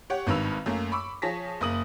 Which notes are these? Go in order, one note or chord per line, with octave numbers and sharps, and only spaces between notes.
G4 C#5 F#5
G#1 G2 D#3 B4 E6 F7
F#2 A3 A#3
B5 C#6 D6 E6
F3 G#4 C#5 A5 A#6 B6
F#1 A#3 D#6 F#7